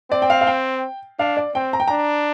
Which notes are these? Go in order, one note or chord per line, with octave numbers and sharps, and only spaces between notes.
C4 D5
G5
F5
F5
G5
D4 F5
D5
C4 G5
A#5
G5
D4 A#5